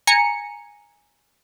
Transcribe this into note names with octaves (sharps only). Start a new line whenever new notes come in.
G#5 A#5 C#7